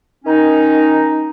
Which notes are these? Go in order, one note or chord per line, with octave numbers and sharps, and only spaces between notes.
D#3 C#4 D#4